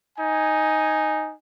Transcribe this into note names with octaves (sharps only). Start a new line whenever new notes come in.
D#4 G#5